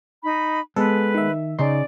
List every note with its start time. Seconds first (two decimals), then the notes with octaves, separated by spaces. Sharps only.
0.22 D#4 B5
0.76 G#3 B3 A4 B4
1.14 D#3 E5
1.59 C#3 D#4 D5 C6